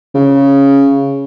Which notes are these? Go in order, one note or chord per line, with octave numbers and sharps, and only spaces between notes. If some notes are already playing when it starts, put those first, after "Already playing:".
C#3